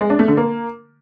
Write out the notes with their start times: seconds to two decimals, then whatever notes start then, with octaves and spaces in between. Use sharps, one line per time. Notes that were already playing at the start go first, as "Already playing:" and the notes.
0.01 G#3
0.10 D4
0.19 A3
0.28 D3
0.37 A#3